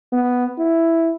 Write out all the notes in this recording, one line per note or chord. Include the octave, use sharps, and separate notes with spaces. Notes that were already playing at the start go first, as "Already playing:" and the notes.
B3
E4